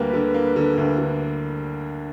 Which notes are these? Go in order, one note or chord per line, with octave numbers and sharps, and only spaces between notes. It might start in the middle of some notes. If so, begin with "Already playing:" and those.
Already playing: D2 G3 A#3 B4
D3
A#3
D3
D2
D3